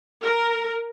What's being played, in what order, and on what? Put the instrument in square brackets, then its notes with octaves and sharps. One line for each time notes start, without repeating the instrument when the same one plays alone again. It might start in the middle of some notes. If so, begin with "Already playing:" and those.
[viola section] A#4